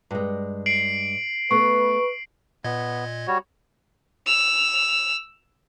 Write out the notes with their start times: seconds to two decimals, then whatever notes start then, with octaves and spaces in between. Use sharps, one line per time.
0.11 G2 G#3
0.66 C7 D7 F#7
1.51 A3 B3 B4 C#6
2.64 A#2 B3 D#5 G#6
3.27 G3 F#4 C#5
4.26 E6 F7